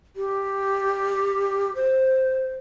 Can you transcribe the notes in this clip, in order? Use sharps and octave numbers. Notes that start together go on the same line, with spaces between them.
G4
C5